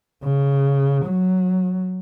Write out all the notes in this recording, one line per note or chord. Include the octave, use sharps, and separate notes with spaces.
C#3
F#3